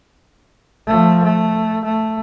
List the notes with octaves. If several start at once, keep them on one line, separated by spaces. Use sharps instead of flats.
F3 A3
A3
A3